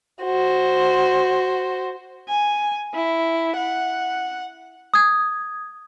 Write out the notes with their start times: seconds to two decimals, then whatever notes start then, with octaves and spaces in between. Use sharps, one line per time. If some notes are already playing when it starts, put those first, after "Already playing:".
0.23 F#4 C5
2.28 G#5
2.94 E4
3.57 F#5
4.94 D#6 G#6